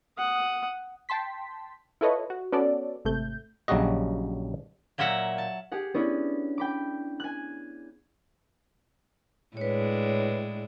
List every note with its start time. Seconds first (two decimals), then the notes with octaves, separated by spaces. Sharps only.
0.18 F#5 D#6
1.09 G5 A5 C6 B6
2.01 E4 F4 A4 B4 C#5 D#5
2.30 F#4
2.52 B3 C#4 F#4 A4 D5
3.05 G#1 C3 A3 G6
3.68 A#1 C#3 F#3 G3 F#4 D#5
4.98 A#2 F#3 A#3 E5 F#5
5.38 A5
5.72 G4 G#4 F#5
5.94 B3 C#4 D4 E4
6.58 G5 B5 D6
7.20 G#5 F#6
9.57 A2 G#3 D4 B4 C#5